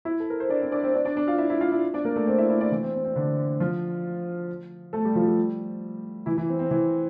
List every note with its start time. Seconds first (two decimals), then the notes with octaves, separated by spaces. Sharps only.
0.05 E4 E5
0.20 A4
0.30 A#4
0.40 C5
0.49 D4 D5
0.61 C4 C5
0.72 D4 D5
0.83 C4 C5
0.94 D4 D5
1.05 D4 D5
1.16 D4 D5
1.27 F4 F5
1.38 E4 E5
1.50 E4 E5
1.61 F4 F5
1.72 E4 E5
1.94 D4 D5
2.05 A#3 A#4
2.16 A3 A4
2.27 C4 C5
2.38 E4 E5
2.49 E4 E5
2.61 D4 D5
2.72 E3 E4
2.83 C4
2.94 C4
3.05 C4
3.16 D3 D4
3.60 F3 F4
4.93 A3 A4
5.05 G3 G4
5.15 F3 F4
5.27 G3 G4
6.26 E3 E4
6.37 E3 E4
6.49 C4
6.59 C4
6.71 E3 E4